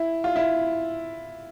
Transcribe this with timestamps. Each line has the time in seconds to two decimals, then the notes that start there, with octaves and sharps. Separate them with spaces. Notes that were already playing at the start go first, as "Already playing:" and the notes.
Already playing: E4
0.24 F4
0.36 E4